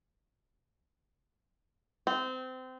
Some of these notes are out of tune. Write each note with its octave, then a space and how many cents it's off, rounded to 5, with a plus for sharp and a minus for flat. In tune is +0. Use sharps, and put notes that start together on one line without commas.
C4 -25